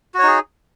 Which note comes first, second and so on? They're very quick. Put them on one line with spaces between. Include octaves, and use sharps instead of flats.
F#4 C#5 D#4 G#4